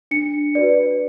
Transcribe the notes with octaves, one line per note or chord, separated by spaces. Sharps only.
D4 C#7
F#4 B4 D5